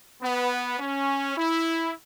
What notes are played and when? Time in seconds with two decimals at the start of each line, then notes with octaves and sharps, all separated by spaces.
0.21 B3
0.79 C#4
1.37 E4